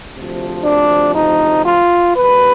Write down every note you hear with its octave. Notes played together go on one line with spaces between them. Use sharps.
D2 C3 F3
D4
D#4
F4
D#2 D#3 G3 B4